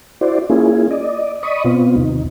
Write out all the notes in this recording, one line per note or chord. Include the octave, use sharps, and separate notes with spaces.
E4 F#4 C5 D5
A#3 C#4 E4 F4 G#4
D5 D#5
D5 D#5 B5 C#6 D#6
B2 B3 C4 F4
D#2 C3 D#4